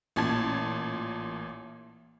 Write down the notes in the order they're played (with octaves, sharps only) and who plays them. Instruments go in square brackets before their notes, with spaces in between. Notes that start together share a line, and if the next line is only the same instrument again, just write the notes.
[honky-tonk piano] A1 A#2 A5 G#6